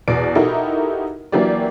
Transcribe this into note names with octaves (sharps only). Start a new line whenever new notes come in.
E2 B2 D5 D7
D#4 E4 F#4 G4 A4 A#4
E3 F#3 A#3 D4 G4 D5